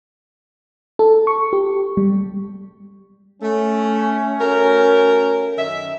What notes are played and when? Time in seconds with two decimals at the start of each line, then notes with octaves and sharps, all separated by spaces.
0.99 A4
1.27 C#6
1.53 G4
1.97 G3
3.42 A3 C#4
4.40 A3 F#4 A#4
5.58 F#2 D#3 E5